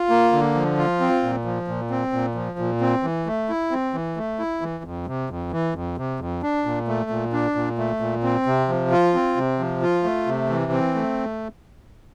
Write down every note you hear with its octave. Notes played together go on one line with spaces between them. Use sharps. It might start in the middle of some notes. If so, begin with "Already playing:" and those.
Already playing: F4
A#3
D3
F3
F4
C4
A#2
F3
A#2
C4
A#2
F3
A#2
C4
E3
A3
E4
C4
E3
A3
E4
E3
F2
C3
F2
E3
F2
C3
F2
D4
A#2
A3
A#2
D4
A#2
A3
A#2
C4
C3
F3
F4
C4
C3
F3
F4
A3
C3
E3
C4
A3